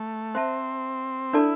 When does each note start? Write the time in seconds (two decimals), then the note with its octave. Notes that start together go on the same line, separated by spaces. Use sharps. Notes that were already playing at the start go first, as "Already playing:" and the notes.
Already playing: A3
0.35 C4 C5 E5 A5
1.33 D4 E4 A4 D5 A5